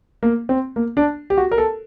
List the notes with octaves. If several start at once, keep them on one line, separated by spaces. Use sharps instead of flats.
A#3
C4
A#3
D4
G4
F#4
A#4
A4